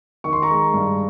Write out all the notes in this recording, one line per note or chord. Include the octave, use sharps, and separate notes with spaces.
D#3 C#6
C6
A#5 C#6
G#3
G2